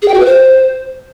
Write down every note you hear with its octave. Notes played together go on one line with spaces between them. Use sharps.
G#4
G5
F#4
B4
C5